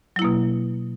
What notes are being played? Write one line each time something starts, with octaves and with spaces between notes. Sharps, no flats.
B2 F#3 A#3 E4